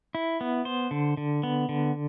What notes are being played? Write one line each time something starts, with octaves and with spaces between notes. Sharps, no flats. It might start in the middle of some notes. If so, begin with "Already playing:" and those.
E4
B3
C5
D3
D3
B3
D3